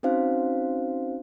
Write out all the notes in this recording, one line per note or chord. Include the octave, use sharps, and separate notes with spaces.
C4 C#4 D#4 F#4 C5 F5